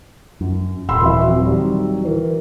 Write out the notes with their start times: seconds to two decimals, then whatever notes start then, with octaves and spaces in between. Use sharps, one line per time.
0.41 F#2
0.89 D#1 B5 C6 E6
1.02 E3 F#4 E5
1.27 F#3 C4
1.46 D#3 G3
2.05 E3 A#4